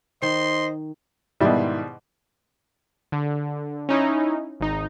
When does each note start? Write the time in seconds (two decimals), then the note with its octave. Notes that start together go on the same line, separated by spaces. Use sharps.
0.22 D#3 C5 D#5 C6
1.40 G#2 B2 D#3 G3 E4
3.12 D3
3.89 C#4 D#4 E4
4.60 G#1 D#4